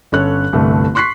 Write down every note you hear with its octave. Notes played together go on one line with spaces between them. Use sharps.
G1 C#4 A4 C#5 F#6
G1 C2 A3
C6 C#6 F#6 B6 C7